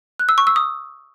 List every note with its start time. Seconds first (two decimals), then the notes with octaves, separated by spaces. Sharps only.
0.19 F#6
0.29 E6
0.38 C#6
0.47 E6
0.56 D#6